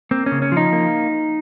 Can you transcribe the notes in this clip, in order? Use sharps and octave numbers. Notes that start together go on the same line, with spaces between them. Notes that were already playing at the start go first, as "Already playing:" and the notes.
A#3 C4
C#4
C#3
C#4
F3 D#4
A#3